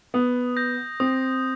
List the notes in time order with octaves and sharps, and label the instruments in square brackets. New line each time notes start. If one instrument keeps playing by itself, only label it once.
[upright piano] B3 [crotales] D#6
[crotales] G6 A#6
[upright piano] C4 [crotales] D#6